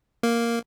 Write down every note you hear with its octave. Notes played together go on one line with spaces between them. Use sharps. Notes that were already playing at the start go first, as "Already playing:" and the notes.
A#3